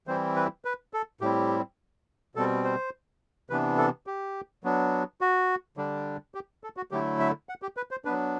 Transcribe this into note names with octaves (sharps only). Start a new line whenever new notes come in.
E3 G3 C4 E4 C5
B4
B4
A4
A2 G3 C4 E4 G4
B2 G3 C4 A4
C5
C3 E3 B3 D4 B4
A4
G4
F#3 B3 D4
F#4
D3 G3 D4
G4
A4
F#4
D3 F#3 A3 E4 G4
E5
F#5
G4
B4
C5
F#3 B3 D4 B4